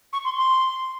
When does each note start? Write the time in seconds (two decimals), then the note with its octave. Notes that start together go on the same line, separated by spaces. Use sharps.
0.13 C#6
0.24 C6
0.37 C6